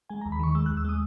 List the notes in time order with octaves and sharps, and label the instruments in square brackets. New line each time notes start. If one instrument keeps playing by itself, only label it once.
[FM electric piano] G#3 G#5
A#5
D#2
B5
D#3 C#6
G#3 E6
F#6
D#2
E6
G#3 D#6